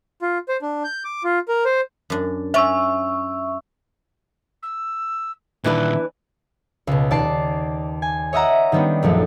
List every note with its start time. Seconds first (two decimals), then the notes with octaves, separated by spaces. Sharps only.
0.22 F4
0.49 C5
0.62 D4
0.84 G6
1.04 D6
1.24 F4
1.48 A#4
1.65 C5
2.10 F#2 D4
2.54 C#4 D5 E5 C#6 E6
4.62 E6
5.64 A#2 D#3 E3 D4 B4 E5
6.87 C#2 B2
7.11 D#2 D5 A5 D6 C7
8.02 G#5
8.33 C#5 D#5 E5 F#5 A#5
8.72 D#3 G3 B3 C#4 D4
9.02 A#1 F#2 F3 A3